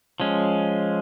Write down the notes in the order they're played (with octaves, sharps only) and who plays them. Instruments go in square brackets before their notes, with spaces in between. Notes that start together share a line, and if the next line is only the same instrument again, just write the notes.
[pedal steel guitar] F3 G#3 C#4